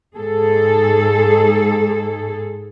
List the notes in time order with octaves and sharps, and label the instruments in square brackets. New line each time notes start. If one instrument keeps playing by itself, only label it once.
[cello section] G#2 G#4 A4